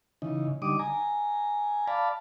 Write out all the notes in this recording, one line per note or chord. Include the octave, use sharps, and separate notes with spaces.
C#3 E3 D#4
D3 G3 D#4 D6 D#6
G#5 A#5
D5 F5 A5 B5